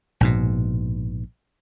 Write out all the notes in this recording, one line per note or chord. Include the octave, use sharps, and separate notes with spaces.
A#1 G#2 B2